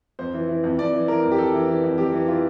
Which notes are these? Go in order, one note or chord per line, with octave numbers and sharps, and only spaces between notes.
F2 C5
E3
E3
F2
F2 D5
E3
E3 A#4
F2
G4
F2 A4
E3
E3
F2
F2 G4
E3
E3 F4